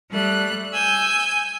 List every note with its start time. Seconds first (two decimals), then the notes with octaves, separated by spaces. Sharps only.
0.11 G3 A3 F#6
0.73 G#5 E6 G6